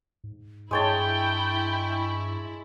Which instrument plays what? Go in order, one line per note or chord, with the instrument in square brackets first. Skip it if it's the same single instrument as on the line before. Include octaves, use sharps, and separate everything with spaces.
[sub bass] G#2
[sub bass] G2 [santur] G#3 C#5 A5 [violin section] E4 [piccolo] G5